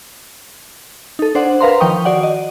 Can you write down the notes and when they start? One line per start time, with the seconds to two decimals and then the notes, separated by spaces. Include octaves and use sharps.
1.19 D#4 A4
1.35 D4 C5 D5 F#5
1.61 A#4 B4 F5 A#5 C6
1.80 D#3 F3 F5 G5 C#6 D#6
2.05 F#4 D5 F#5
2.23 D#5